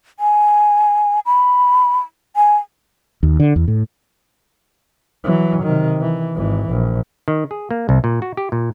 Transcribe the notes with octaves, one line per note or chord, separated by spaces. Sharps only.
G#5
B5
G#5
D#2
D3
E2
A2
E3 F#3
C3 D#3
E3
G#1 E3
A#1
D#3
G#4
A#3
C2
A#2
F#4
G4
A#2